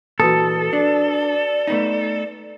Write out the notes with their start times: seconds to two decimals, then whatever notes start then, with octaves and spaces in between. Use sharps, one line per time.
0.20 A#2 E3 F#4 A4 B4 D#6
0.73 D4 D5
1.67 A3 B3 D#4